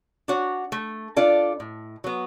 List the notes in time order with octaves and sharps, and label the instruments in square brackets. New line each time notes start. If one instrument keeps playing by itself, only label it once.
[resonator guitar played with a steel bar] D4 F#4 C#5
A3
D4 F4 A4 D5
A2
F#3 B3